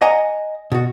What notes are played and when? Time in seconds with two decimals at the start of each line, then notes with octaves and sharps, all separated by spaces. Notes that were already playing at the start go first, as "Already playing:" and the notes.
0.02 D#5 F#5 G#5 A#5
0.72 B2 F#4